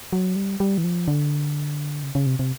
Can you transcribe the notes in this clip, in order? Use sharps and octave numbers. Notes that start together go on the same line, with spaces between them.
F#3
G3
G3
E3
F3
D3
C#3
C#3
C3
C3